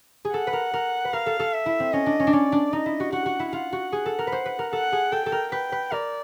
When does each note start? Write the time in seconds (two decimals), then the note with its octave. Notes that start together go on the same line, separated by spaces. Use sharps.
0.25 G#4
0.33 A4 F#5
0.47 B4
0.53 A#4
0.74 A#4
1.05 B4
1.13 A#4 F5
1.26 A4
1.40 A4
1.53 E5
1.66 E4
1.80 C4
1.92 C#4 D#5
2.06 D4
2.20 C#4
2.27 D4
2.33 C#4 D5
2.52 D4
2.72 D#4 D#5
2.86 E4
3.00 F#4
3.12 F#4 F#5
3.26 F#4
3.39 E4
3.52 F4 F#5
3.73 F#4
3.92 G#4
4.06 A4
4.19 A#4
4.27 B4
4.32 C5
4.46 B4
4.59 A#4
4.72 A4 F#5
4.92 G#4
5.12 A4 G5
5.26 A4
5.32 A#4
5.52 B4 G5
5.72 B4
5.92 A#4 D5